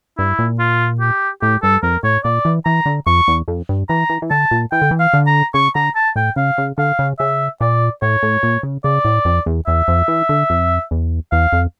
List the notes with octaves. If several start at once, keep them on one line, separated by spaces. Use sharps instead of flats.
G2 E4
A#2
F4
G4
A2 G4
G2 A4
F2 A#4
A2 C#5
A#2 D5
E3
E3 A#5
D3
F2 C#6
E2
F2
G2
E3 A#5
E3
E3
D3 A5
A#2
E3 G5
D3
E3
F5
D3
A#5
C#3 C#6
D3 A#5
A5
A2 G5
C#3 F5
C#3
D3 F5
C#3
C#3 E5
A#2 D5
A2 C#5
A2
A#2
C#3
C#3 D5
A2
F2
E2
E2 E5
F2
E3
D3
F2
E2
E2 F5
F2